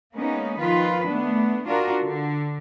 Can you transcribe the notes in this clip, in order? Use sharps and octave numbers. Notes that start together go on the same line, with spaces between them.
G#3 A#3 B3 C#4 D#4
D#3 F3 F4 B4
A3 B3 D4
D4 F4 F#4 A#4
D3